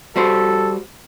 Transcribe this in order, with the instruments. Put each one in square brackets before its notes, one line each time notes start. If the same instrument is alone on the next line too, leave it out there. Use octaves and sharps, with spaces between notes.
[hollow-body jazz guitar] G3 F#4 C5 [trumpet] A4